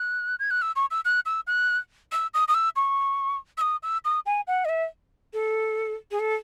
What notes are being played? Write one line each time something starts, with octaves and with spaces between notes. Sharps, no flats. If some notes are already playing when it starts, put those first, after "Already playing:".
Already playing: F#6
G#6
F#6
E6
C#6
E6
F#6
E6
F#6
E6
D#6
D#6
E6
C#6
E6
D#6
E6
D#6
G#5
F#5
D#5
E5
A4
G#4
A4